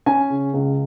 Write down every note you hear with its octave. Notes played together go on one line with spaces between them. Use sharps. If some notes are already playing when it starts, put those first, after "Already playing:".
C#4 G#5
C#3
C#2